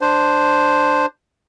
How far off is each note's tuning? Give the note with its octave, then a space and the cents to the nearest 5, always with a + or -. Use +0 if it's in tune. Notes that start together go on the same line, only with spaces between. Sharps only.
D4 +10 C5 +0